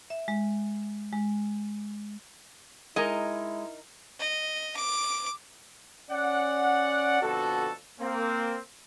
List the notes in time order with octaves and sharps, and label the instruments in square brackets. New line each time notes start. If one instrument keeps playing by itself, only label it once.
[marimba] E5
G#3
G#3
[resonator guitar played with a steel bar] G#3 D#5 [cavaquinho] D#4 A#4 [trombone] E4
[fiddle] D#5
D6
[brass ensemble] C#4 D5 F#5
F2 B2 D3 F#4 A4
A#3 C4